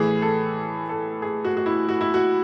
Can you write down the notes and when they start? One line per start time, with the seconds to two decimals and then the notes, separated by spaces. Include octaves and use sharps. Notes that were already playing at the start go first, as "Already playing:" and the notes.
Already playing: A2 E3 G#4
0.22 A4
0.89 A4
1.22 G#4
1.45 F#4
1.57 F#4
1.66 E4
1.89 F#4
2.01 E4
2.14 F#4